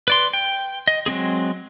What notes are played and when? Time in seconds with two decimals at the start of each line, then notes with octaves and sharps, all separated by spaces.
0.08 B4 D5 C6
0.33 G5
0.87 D#5
1.06 F#3 G#3 C4 G#4